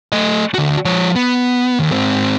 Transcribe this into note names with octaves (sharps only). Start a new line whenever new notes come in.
A3 D#5
D3 F#4
F3 C#5
B3
D#2
G#2 C4